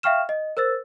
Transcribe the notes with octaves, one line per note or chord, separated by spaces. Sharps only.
E5 F5 G5 C#6 F6 E7
D#5
A#4 C5 E6 A6